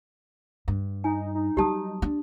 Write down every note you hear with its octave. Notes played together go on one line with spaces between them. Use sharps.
G2
D#4 G#5
D#4
F#3 G3 G4 A5 D#6
D4